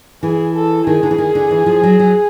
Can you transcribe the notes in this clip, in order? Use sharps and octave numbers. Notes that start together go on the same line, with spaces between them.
E3 G#4
A4
D#3 G#4
D3
E3
D#3
D3
E3
F3
F#3
F#3